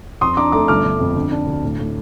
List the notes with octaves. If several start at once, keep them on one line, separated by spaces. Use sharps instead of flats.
F2 C6 D#6
D4 A#5 D6
A3 A#5 D6
G1 D6 F6
G1
F2
D3
D4
D2
A2
A2